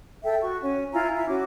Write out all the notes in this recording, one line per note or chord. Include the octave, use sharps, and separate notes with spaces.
A4 E5 G5
F#4 C#6
C#4
E4 F4 G#5 A#5
E4 E5
C#4 F#4 D6